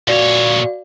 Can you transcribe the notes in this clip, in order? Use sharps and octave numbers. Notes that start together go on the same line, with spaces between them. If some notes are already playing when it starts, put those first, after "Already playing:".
A#2 F#4 C#5 D5 F5